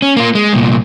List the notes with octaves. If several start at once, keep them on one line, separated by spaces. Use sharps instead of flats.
C#4
A#3 F4
G#3
C2 A#2